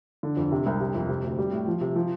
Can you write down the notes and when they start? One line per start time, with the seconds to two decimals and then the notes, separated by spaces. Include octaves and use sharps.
0.23 D3
0.37 F2
0.52 C3
0.66 C2
0.80 C3
0.95 F2
1.09 C3
1.24 D2
1.38 G3
1.52 A2
1.67 F3
1.81 C3
1.96 F3